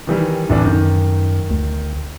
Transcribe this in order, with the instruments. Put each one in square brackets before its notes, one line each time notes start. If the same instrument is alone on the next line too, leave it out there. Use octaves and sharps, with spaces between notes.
[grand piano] D#3 E3 G3
D1 E3 D4
[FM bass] F#2 [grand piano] D#3
[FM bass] D2